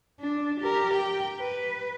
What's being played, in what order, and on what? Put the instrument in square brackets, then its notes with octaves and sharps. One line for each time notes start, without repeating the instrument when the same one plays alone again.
[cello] D4
G4 A#4
G5
B4